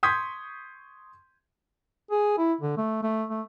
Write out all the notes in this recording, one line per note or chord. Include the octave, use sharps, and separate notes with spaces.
C6 C#6 D#6 G6 G#6 B6
G#4
E4
D3
A3
A3
A3